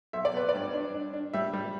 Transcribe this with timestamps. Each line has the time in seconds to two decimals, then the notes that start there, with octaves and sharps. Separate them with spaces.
0.13 B1 E5
0.25 D5
0.34 B3 B4
0.49 D5
0.54 G2
0.73 D4
0.94 D4
1.13 D4
1.33 G3 E5
1.53 G3